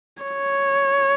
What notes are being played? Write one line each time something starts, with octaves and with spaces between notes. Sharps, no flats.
C#5